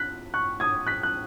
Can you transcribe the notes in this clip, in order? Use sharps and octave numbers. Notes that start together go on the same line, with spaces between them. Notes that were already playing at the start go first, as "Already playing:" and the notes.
Already playing: F#6 B6
C#6 F#6
D#6 G#6
F#6 B6
F#6